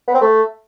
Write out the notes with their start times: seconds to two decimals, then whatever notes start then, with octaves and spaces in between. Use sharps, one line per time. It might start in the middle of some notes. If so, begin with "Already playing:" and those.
0.08 B3
0.15 C4
0.21 A3